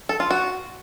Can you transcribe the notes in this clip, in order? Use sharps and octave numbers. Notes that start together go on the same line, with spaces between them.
A4
F4
F#4